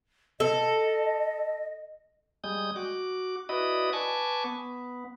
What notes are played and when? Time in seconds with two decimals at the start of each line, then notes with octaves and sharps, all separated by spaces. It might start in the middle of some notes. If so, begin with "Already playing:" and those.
0.40 A4 D#5
2.44 G3 G#3 D#6 G6
2.76 F#4 D6
3.49 E4 F#4 B4 D5 D#5 D#6
3.93 B4 G#5 A5 C#6 D6
4.44 B3